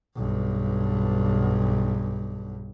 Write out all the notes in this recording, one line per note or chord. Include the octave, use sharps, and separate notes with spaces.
B1 G2